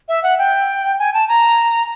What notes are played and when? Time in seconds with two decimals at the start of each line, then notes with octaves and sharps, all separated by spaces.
0.09 E5
0.23 F#5
0.38 G5
0.99 G#5
1.13 A5
1.28 A#5